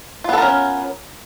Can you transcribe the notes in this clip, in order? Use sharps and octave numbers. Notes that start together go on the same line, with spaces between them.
B3 C#4 F4 A4 A#4